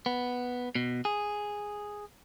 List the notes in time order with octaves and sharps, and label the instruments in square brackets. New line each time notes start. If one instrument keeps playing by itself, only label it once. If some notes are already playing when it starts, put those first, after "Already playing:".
[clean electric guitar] B3
B2
G#4